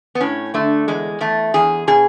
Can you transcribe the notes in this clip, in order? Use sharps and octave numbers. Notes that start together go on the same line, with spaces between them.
B3
A2 C#4
D3 A3
E2 G#3
E2 A3
E2 G#4
B2 G#4